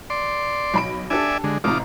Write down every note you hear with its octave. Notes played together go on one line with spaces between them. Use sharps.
D5 C6
B1 B5 D7
D4 G4 A4 D5 E5 G#5
D3 G#3
A1 C3 D#4 F4 A#5 D6